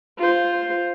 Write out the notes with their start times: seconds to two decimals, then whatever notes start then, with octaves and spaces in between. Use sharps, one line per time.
0.19 F4 C5